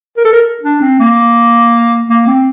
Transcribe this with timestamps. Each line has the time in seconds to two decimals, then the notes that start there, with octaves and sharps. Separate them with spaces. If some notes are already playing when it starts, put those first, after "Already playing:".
0.17 A#4
0.25 A4
0.33 A#4
0.63 D4
0.81 C4
1.00 A#3
2.10 A#3
2.27 C4